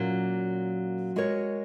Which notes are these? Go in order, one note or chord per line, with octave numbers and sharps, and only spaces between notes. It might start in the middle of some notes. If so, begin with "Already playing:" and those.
Already playing: A#2 F#3 A#3 C#4
G#3 F#4 A#4 C#5